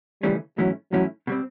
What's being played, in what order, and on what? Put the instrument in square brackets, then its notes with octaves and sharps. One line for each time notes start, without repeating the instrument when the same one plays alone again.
[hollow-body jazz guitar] D#2 C#3 E3 A3 C#4 [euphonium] G3
[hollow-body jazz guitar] G#2 E3 A3 C#4 E4 [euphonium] F#3
[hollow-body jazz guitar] G#2 E3 A3 C#4 E4 [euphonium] F#3
[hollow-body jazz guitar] B2 G3 C4